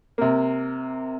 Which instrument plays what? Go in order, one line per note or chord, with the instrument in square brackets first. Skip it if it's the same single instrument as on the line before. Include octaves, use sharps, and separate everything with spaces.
[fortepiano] C3 A#3